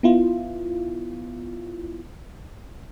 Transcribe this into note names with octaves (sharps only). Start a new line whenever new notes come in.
B3 E4 F4